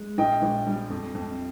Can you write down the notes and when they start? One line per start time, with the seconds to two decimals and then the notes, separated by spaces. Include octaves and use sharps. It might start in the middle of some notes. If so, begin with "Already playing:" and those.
Already playing: G#3
0.18 A#1 D#5 G5
0.42 A#1
0.67 G3
0.90 F2
1.15 F2